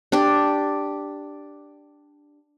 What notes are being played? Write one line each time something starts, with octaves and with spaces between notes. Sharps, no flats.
D4 G4 D5